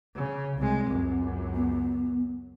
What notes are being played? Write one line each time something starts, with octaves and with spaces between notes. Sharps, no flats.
C#3
C2 G#3 C4
C#2 F#2
B3